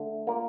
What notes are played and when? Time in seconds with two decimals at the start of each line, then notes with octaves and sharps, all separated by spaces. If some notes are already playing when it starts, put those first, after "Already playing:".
Already playing: D3 A3
0.27 A#3 F4 A#4 D5